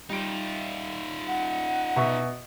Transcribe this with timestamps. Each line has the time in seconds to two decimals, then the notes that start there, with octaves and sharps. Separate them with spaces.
0.10 G3 D#4 F4 D7
1.27 F#5
1.96 B2 E5 C#6